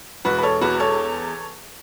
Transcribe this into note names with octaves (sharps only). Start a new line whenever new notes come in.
E1 F#4 B4
B4
A4 C#5
E2 F#4 B4
A4 C#5